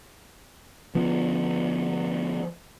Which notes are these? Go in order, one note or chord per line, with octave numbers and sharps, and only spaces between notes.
D3 F3 B3